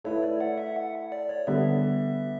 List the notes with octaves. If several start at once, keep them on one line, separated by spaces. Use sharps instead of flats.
A3 E4 B4 C#5
D5
F#5
E5
F#5
D5
C#5
D3 G3 B3 E5